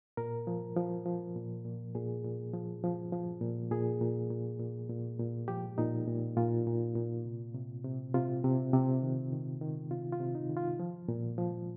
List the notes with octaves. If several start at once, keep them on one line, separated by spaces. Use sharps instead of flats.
A#2 A#4
F3
F3
F3
A#2
A#2
A#2 G#4
A#2
F3
F3
F3
A#2
A#2 G#4
A#2
A#2
A#2
A#2
A#2
F3 G4
A#2 D#4
A#2
A#2 F4
A#2
A#2
C3
C3
C3
C3 F4
C3
C3
D#3
D#3
D#3
C3 F4
F4
C3
D#4
D#3
F4
F3
A#2
F3